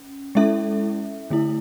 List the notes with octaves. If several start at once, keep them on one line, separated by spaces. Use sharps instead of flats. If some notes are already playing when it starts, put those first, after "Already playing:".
Already playing: C#4
G#3 C#4 E4 A4 E5
D3 A3 E4